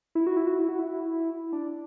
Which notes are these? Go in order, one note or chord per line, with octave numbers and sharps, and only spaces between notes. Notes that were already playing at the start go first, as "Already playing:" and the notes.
E4
F#4
E4
F#4
E4
F#4
E4
D4